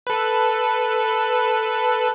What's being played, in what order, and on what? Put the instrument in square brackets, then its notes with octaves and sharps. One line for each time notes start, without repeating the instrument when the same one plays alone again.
[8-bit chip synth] A4 B4